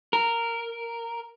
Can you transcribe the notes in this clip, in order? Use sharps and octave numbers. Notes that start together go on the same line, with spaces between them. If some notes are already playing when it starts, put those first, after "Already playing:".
A#4